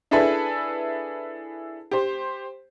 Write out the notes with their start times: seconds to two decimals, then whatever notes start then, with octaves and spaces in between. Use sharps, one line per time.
0.11 D4 E4 G#4 A4 B4 E5
1.91 G4 C5